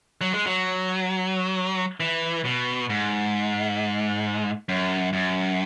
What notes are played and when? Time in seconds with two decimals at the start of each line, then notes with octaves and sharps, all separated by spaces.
0.21 F#3
0.34 G#3
0.46 F#3
2.00 E3
2.45 B2
2.90 G#2
4.69 F#2
5.13 F#2